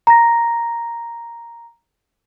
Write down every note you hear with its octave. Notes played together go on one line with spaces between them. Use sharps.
A#5 A#6